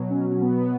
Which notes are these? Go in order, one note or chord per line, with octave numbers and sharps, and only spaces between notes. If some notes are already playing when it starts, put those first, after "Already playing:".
Already playing: B2 F#3
C#4
C#4
B3